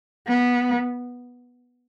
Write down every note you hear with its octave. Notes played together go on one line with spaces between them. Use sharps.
B3